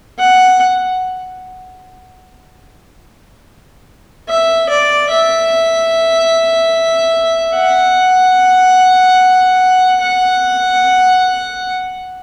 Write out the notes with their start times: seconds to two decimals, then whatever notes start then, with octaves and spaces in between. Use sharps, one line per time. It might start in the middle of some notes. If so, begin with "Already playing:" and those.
0.19 F#5
4.29 E5
4.69 D5
5.10 E5
7.55 F#5
10.00 F#5